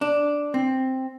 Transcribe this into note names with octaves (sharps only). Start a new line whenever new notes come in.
D4
C4